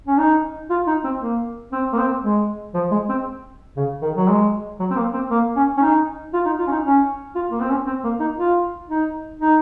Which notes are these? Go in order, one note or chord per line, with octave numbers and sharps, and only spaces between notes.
C#4
D#4
F4
D#4
C4
A#3
C4
A#3
C4
G#3
F3
G#3
C4
C#3
D#3
F#3
G#3
F#3
C4
A#3
C4
A#3
C#4
C#4
D#4
F4
D#4
F4
C#4
D#4
C#4
F4
A#3
C4
C#4
C4
A#3
D#4
F4
D#4
D#4